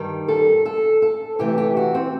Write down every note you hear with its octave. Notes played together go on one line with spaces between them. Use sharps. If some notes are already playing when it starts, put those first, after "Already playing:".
Already playing: G2 D#3 G3
A4
A4
A4
C3 E3 A3 G4
G4
F#4
C4